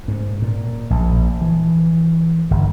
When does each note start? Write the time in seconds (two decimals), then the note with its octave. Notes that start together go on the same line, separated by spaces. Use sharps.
0.08 G#2
0.42 A#2
0.90 A#1
1.42 E3
2.51 G1